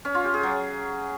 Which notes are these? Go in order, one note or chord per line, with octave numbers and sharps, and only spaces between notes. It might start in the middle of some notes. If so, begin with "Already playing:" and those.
C#4
F4
G4
G#4
F#3